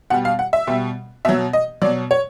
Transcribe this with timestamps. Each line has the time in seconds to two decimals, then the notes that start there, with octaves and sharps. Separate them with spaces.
0.10 B2 G3 F#5
0.25 F5
0.39 F#5
0.53 E5
0.67 B2 G3
1.25 B2 F#3 E5
1.53 D#5
1.82 B2 F#3 D5
2.11 C#5